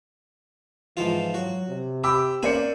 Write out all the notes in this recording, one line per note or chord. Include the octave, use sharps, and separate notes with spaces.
G#2 E3 F3 F4
F#3 F#4
C3
G4 B5 D6 E6
A#3 C#4 C5 D5 G#5 B5 C#7